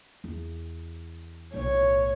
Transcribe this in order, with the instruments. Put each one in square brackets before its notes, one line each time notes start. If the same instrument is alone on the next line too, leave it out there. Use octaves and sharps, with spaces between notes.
[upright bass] E2
[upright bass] B1 A2 [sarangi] C#5